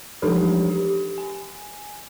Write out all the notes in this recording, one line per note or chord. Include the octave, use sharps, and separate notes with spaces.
E3 F3 D4 D#4 G4 A4
G4
G#5